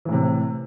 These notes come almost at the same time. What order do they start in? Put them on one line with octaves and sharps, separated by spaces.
E3 A2 C3